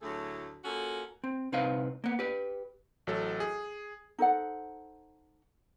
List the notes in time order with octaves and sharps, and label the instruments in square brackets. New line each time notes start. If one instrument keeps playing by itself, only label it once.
[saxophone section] D2 A2 F#3 A3 G#4 A4
A#3 C#4 F4 F#4 A4
[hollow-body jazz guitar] C4
C2 C4 D#4 B4 F5
A#3 B3
G4 B4
[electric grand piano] A1 F#3 A4
G#4
[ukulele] D#4 A4 C5 F#5